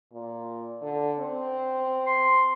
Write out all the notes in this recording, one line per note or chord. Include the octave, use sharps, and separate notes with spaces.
A#2
D3
C4
C6